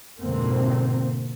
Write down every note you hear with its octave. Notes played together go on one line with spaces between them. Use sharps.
F2 G#2 B2 D3 A#3 C4